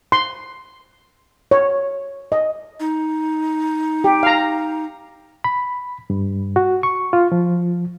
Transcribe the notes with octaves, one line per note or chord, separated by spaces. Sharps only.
C6
C#5
D#5
D#4
G4
F5 A#5
B5
G2
F#4
C#6
F4
F3